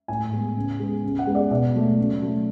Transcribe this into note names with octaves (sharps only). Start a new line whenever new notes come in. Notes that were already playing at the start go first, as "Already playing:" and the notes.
A2 G#5
G#3 B3
C#3
G#3 B3
C#3
F#5
G#3 B3
D5
B2 D5
F#3 A3
C#3
F#3 A3